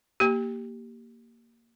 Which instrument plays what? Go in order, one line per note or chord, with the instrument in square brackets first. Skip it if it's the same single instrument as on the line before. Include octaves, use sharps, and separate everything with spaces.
[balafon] A#3 G4